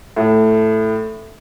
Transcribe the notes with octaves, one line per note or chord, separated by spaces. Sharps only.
A2